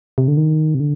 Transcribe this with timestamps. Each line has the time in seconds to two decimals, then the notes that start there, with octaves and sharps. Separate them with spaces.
0.18 C3
0.28 D3
0.37 D#3
0.75 C3
0.80 D3